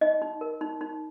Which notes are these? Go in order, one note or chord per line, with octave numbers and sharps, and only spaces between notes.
D#4 D#5
D#4
A#4
D#4
D#4